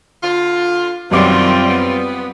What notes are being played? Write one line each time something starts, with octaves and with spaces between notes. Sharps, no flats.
D3 F4
F#2 B2 D#3 G3 C4 F4 D5 D6
B3